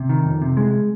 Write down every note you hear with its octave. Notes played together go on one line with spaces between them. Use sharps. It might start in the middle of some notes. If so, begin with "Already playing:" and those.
Already playing: C3
D#3
F2
C3
G#3